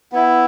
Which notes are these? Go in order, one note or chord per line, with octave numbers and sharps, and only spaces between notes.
B3 E4